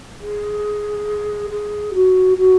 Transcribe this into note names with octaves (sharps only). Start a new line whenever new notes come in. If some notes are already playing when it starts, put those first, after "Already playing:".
G#4
G#4
F#4
F#4